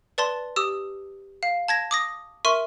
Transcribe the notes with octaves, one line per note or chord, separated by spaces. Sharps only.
B4 D5 A5 C6
G4 D#6 E6
F5
A5 G#6 A#6
D6 D#6 A#6
A#4 E5 C6 C#6 D#7